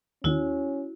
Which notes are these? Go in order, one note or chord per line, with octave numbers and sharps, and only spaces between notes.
D#2 D#3 C#4 E4 F#4